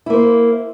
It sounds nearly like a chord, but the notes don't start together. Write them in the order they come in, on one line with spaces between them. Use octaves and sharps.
E4 A#3 C5